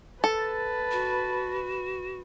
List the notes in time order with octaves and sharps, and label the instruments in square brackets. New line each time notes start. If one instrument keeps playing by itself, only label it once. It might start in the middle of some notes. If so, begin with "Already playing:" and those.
[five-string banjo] A4 [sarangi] B4 [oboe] A5
[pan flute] F#4